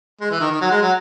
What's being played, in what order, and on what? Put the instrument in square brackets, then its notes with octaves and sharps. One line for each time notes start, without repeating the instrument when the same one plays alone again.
[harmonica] G#3
E3
D#3
D#3
F#3
G#3
F#3